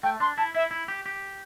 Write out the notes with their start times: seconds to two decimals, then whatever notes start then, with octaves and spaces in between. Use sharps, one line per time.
0.03 A3 G5
0.20 D4 C6
0.37 E4 A5
0.55 E4 E5
0.71 E4
0.88 G4
1.06 G4